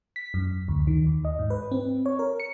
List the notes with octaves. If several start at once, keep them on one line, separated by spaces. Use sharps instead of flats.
B6
F#2
D2
D#3
D#2
D#5
G#2
B4
C4
C#5
A#4
C#7